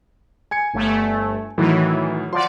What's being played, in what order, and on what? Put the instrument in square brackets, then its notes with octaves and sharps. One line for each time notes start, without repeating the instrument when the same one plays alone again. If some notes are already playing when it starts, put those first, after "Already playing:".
[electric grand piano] G#5 G#6 C#7
[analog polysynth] G1 A3
[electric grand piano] A2 D#3 F#3 [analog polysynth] E3
[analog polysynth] F3 D5 [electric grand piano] F#5 C6